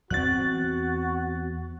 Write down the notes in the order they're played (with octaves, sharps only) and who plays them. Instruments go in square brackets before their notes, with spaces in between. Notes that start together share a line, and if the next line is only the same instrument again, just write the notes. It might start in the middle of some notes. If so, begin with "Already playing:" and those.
[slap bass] E2 A#3 C4 [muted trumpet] F#4 [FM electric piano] F#6 A6